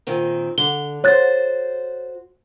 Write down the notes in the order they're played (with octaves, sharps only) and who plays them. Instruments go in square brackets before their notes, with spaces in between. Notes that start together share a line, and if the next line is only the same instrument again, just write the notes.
[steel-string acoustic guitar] A#2 D#3 C4
[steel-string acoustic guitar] D3 [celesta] G7
[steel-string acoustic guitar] F#4 C5 [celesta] C#5 F#6 A6